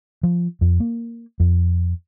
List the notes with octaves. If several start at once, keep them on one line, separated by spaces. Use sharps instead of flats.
F3
F2
A#3
F2